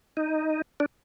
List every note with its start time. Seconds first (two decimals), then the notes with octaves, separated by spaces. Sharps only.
0.17 D#4
0.80 D4